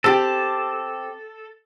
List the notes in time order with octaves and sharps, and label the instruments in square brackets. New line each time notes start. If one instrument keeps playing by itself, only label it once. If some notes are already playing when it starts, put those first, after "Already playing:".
[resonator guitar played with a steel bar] C4 G4 [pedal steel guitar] A4